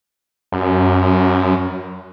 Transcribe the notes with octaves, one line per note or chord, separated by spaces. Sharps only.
F#2